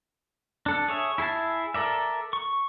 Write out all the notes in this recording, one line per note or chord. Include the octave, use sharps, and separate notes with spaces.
D4 A4
G#4 C#5 E5
E4 G#4 E5 A5
A4 A#4 D5 E5
C#6